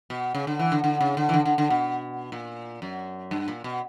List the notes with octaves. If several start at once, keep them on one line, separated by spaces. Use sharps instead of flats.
B2
C#3
D3
E3
D3
D3
C#3
D3
E3
D3
D3
D3
B2
A#2
F#2
G2
A#2
B2